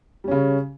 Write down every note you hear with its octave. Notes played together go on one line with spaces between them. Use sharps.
C#3 G3 C#4